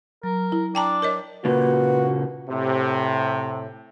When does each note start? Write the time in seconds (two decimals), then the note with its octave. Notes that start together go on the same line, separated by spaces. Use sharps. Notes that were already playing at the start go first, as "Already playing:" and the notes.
0.24 F#3 A#4
0.52 E4
0.75 D4 G5 A5 A#5
1.02 A#4 C#5 D#5
1.45 A#2 C#3 A#3 F#4 B4
2.48 A2 C3